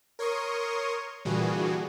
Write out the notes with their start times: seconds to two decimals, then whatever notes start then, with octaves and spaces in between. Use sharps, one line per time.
0.19 A#4 C#5 C6 C#6 D#6
1.25 A#2 D3 E3 G3 F#4 G#4